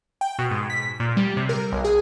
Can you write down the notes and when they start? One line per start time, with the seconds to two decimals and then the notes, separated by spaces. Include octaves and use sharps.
0.21 G5
0.39 B2
0.51 G#2
0.70 B6
1.00 A#2
1.17 G3
1.37 C3
1.49 A#4
1.72 B1
1.84 G#4